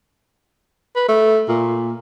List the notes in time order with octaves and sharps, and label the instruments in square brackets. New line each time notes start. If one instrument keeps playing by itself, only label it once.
[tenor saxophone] B4
A3
A#2